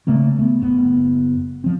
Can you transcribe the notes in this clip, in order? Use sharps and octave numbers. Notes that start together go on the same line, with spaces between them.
C#3 A3 A#3 C4
A3 B3
F#1 B3
F3 C4